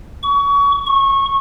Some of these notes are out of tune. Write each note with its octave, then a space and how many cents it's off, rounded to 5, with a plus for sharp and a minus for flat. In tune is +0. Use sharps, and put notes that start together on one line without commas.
C#6 +30
C#6 -20